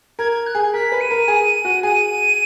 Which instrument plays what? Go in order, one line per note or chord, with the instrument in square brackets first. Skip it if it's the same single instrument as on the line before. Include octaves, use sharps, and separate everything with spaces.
[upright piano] A#4 [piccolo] G#6
[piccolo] G#6
F#6
[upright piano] G#4
[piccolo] G#6
[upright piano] A#4 [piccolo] B6
[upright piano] B4
[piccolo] D#7
[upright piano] A#4
G#4
F#4
[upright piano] G#4 [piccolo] D#7